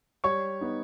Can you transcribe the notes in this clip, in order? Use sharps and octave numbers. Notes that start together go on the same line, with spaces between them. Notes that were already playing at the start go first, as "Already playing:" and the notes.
G3 C#5 C#6
B3 D#4